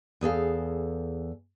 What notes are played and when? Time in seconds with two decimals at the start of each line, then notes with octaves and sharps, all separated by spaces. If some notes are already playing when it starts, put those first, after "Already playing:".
0.21 E2 G#4 A4 F5